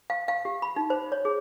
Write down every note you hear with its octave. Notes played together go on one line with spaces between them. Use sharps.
F5
F5
G4
B5
D#4
C5
C#5
G#4